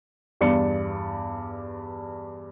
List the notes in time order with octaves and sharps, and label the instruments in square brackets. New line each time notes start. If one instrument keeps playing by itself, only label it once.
[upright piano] E2 G2 D5 C#7